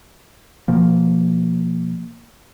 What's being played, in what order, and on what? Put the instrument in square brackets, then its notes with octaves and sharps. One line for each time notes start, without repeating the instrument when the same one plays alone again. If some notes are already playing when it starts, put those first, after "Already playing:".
[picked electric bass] B2 F3 A#3